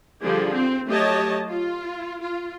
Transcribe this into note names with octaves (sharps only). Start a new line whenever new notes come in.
D3 F3 G3 G4 G#4
C4
F#3 A3 G4 C#5 D#5 A5
F4
F4